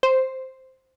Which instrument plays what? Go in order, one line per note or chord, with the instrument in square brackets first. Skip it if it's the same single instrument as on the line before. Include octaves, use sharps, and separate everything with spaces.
[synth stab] C5